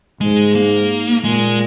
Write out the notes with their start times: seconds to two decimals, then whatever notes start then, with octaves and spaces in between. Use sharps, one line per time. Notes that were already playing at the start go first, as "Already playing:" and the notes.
0.21 G#2 G#3
0.55 A#3
1.23 A#2 G#3